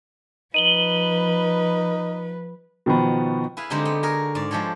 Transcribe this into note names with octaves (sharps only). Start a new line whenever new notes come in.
F3 D#4 B4 D#7 F#7 G7
B2 D#3 F3 B3
E4 G#4 B4 F5
D3 G#3 C4 D#4 G4
B3
F#4 G#4 A#4
G#2 D5
F3 G#3 G4 A4 C#5